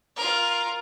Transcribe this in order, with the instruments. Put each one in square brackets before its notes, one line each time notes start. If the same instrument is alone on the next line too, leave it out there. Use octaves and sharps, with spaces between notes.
[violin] F4 A#4